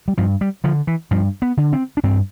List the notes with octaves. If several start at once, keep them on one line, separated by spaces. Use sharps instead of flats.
G3
G2 F3
G3
D3 F3
E3
G2 F3
B3
D3
C4
D4
G2 C4